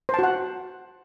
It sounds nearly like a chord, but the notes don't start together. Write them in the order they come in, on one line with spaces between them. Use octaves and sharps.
C5 A5 F#4 F#5